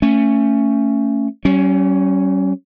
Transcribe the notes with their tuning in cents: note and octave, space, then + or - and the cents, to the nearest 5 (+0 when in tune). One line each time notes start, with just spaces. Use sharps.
A3 +20 C#4 +0
G3 -45 C#4 -5